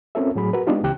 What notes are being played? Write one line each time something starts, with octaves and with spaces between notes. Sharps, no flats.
C4 C#4 F4 A4 A#4 E5
A2 F#3 G#4 B5
F#4 A#4 B4
G#3 B3 D4 D#4 F4 G4
C#2 C#3 E3 G4 G5 F#6